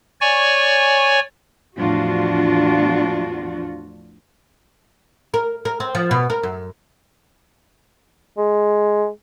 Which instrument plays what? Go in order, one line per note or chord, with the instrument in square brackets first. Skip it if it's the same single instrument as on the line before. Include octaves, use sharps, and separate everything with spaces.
[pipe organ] C#5 D5 G#5 C#6
[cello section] E2 A2 F3 D4 F4 F#4
[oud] A#4
A#4
C4
F3
B2
A#4
F#2
[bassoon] G#3